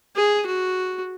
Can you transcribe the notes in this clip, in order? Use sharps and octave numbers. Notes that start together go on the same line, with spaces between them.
G#4
F#4